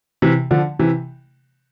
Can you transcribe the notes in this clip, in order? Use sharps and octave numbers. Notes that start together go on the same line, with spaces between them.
C3 E3
D3 F3
C3 E3